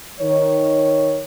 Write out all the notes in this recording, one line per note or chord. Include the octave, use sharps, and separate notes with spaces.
D#3 C#5